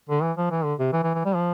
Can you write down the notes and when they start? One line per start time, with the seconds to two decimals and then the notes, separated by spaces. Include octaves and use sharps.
0.09 D3
0.22 E3
0.37 F3
0.51 E3
0.64 D3
0.79 C3
0.93 E3
1.03 E3
1.14 E3
1.25 G3
1.35 F3